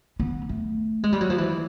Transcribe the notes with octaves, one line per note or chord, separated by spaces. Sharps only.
B3
A3
G#3
G3
F#3
F3
E3